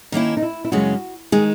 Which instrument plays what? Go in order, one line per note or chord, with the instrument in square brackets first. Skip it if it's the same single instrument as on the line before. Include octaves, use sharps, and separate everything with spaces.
[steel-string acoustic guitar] D#3 A#3 C#4 E4 [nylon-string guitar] D#4
[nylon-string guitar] D#4
E4
E4
[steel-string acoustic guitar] F#2 C#3 G#3 C#4 [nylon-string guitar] F#4
[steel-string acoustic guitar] D#3 G#3 [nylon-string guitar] G#4